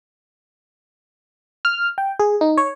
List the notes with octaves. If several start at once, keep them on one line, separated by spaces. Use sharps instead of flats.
F6
G5
G#4
D#4
C#5